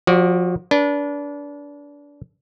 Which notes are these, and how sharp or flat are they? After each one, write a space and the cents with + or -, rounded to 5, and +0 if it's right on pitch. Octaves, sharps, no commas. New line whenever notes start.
F3 +30 F#4 +15 D5 -5
D4 -25 B4 -35